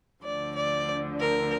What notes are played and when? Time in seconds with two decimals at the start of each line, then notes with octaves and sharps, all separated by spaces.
0.23 D2 D3 F3 D5
0.55 D5
1.19 A#4